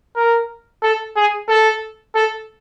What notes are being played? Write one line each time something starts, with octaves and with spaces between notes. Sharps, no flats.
A#4
A4
G#4
A4
A4